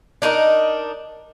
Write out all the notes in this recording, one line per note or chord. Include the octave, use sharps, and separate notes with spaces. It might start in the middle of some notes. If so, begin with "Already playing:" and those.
D4 D#4 F4 A#4